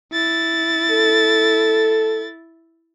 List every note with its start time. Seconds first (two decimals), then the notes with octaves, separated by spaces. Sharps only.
0.13 E4 A6
0.91 A4